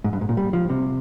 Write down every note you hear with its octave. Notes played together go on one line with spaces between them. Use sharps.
G#2
G2
G#2
A#2
G3
F3
C3